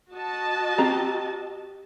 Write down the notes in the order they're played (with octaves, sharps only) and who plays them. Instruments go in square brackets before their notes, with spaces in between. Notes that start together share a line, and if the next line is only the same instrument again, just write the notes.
[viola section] F#4 D#5 A5
[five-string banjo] C4 G4 A#5